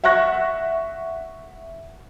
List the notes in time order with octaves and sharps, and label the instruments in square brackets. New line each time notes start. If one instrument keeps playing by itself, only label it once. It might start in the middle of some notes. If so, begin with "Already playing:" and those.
[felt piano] E5 F#5 C#6 F#6 A#6